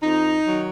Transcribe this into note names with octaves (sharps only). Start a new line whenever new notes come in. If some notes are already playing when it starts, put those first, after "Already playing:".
F2 D#4
D#3 F#3